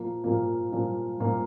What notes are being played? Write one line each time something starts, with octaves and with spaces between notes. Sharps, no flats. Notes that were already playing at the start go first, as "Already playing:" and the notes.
Already playing: A#2 F3 A#3
A#2 F3 A#3
A#2 F3 A#3
A#2 F3 A#3